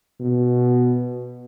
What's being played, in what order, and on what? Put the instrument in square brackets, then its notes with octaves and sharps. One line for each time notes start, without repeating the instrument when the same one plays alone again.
[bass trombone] B2